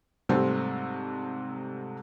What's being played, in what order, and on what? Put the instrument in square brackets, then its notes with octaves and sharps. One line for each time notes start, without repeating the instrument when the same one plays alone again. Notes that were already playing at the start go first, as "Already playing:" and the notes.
[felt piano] G#2 C3 G3 A3 C4